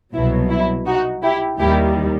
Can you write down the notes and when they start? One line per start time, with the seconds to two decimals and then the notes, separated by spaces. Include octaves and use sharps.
0.14 C2 B2 F#3 E4
0.50 E4
0.86 D#4 F#4
1.23 E4 G4
1.59 D#2 D#3 G3 E4 G4